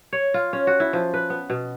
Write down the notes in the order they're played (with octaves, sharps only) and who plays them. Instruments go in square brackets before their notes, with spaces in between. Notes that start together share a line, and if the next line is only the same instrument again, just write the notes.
[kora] C#5
F4
C#4
F#4
E4
F3
B4
B3
B2